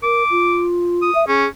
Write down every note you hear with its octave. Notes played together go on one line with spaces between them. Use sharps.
A#4 D6
F4
D#6
E5
C#4 G#4